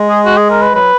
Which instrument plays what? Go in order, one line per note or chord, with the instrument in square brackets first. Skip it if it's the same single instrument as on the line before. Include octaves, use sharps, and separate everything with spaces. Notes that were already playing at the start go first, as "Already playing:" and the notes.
Already playing: [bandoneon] G#3
[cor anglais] G#4
F#4
G#4
A#4
B4
[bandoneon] F#3 [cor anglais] B4